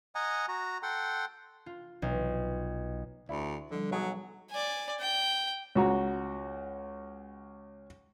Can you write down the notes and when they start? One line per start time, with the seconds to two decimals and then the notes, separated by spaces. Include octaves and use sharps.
0.15 D#5 F#5 G#5 A#5
0.48 F#4 A#5
0.83 A4 F#5 G5 C6
1.66 F4
2.02 B1
3.29 D2 E4 D5
3.71 D3 F3 G3
3.91 B1 F#3 G#4
4.51 D5 G#5
5.00 G5
5.75 C#2 F#4 A#5